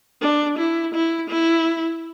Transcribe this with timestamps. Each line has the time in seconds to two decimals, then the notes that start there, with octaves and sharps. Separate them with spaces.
0.21 D4
0.58 E4
0.94 E4
1.30 E4